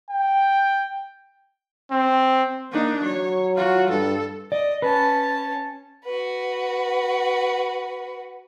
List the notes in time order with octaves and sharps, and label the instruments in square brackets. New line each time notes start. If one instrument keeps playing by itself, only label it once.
[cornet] G5
C4
[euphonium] A#3 [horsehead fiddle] D4 D#4
[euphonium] F#3 [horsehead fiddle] C#5
[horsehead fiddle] F4 F#4
[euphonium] G2 [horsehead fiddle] A4
[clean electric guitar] D5 [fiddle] D#5
[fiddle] C#4 A5 [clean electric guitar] B4
[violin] F#4 B4